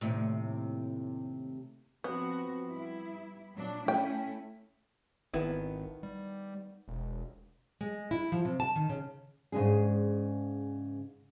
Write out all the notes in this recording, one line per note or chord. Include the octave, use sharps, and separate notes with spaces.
D#2 A2 C3
F3 B3 C4 F#4
G3 E4
A#2 F#3 D4
A3 C#4 E4 G5
G#1 D#3 B3 E4
G3
E1
G#3
E4
F3
C3
A5
D#3
C#3
G#2 C#3 G#3 D4 G#4